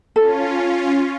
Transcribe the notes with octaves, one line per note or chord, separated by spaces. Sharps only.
C#4 F4 A4